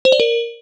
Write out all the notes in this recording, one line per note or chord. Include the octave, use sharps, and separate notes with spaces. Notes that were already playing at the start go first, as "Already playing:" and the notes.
C5
D5
A#4